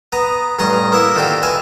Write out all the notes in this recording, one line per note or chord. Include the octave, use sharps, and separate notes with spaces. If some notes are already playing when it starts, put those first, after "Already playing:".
B3 A#5 D#6
A1 G2 A#5 C6 C#6 D#6
A#3 B3 E4 E5
A#2 D3 D#3 C4 F#4 G4
B4 E5 F5 G#5